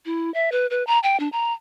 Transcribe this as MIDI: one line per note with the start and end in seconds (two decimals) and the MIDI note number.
0.06 0.32 64
0.34 0.50 76
0.52 0.67 71
0.70 0.85 71
0.87 0.99 82
1.03 1.18 79
1.20 1.28 62
1.32 1.53 82